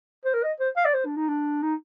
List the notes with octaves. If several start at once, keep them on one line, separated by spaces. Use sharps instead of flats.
C5
A#4
D#5
C5
F5
D5
C5
D4
D#4
D4
D#4